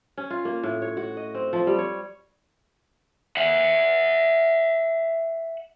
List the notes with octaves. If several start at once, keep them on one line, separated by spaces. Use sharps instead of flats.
C#4
F4
A#3
A2
C#5
F#4
D#5
C4
F3
G3
C#5
E5 F#5